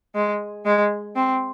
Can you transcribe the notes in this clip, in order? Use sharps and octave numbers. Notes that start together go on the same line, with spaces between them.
G#3
G#3
C4